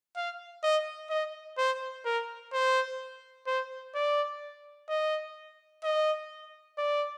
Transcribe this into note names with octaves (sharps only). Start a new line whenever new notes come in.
F5
D#5
D#5
C5
A#4
C5
C5
D5
D#5
D#5
D5